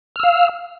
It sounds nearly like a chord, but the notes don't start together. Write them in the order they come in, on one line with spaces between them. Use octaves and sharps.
F6 E6 F5